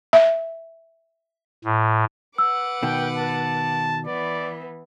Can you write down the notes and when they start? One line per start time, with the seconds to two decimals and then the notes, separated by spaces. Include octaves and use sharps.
0.13 E5
1.64 A2
2.38 B4 F#5 D6 E6
2.83 B2 D#3 G5
3.17 A5
4.06 E3 B3 D5